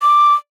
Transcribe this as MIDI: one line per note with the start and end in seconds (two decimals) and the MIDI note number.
0.02 0.34 86